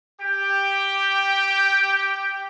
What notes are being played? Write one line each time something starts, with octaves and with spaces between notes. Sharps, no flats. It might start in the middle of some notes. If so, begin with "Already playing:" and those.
G4 G5